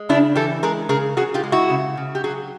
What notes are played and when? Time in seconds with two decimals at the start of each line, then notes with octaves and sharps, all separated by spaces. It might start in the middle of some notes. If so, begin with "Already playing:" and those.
Already playing: G#3
0.09 C#3 D4 E4
0.35 E3 G4 A4
0.63 G#3 G#4 A#4
0.89 C#3 G#4 A#4
1.17 C#3 F#4 G#4
1.34 F4 G4
1.43 G#3
1.52 E4 F#4
1.70 C#3
1.97 C#3
2.15 G4
2.24 F#3 F#4 G#4